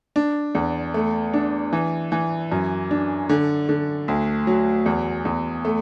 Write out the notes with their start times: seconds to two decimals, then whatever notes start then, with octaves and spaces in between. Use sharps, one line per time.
0.16 D4
0.55 E2
0.94 A3
1.34 D4
1.73 E3
2.12 E3
2.52 F#2
2.91 D4
3.29 D3
3.69 D3
4.08 D2
4.47 F#3
4.86 E2
5.25 E2
5.65 A3